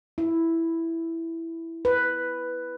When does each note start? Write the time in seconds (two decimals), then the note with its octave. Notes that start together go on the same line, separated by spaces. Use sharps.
0.18 E4
1.85 B4